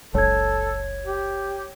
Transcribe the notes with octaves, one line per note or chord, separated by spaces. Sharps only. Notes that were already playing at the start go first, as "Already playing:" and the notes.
F#1 C#2 A4 C#5 G#6
G4